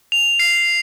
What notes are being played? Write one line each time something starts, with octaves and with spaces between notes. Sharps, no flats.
F7
C7